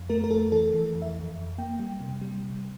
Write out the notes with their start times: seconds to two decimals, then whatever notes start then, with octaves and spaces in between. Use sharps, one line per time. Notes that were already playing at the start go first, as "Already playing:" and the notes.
Already playing: F2
0.09 A3 A#4
0.24 A#4
0.31 F2 A4
0.52 E3 A4
0.73 E3
0.95 F2
1.02 E5
1.16 F2
1.37 F2
1.58 A#3 G5
1.79 G3
2.00 C3
2.22 G3
2.43 C3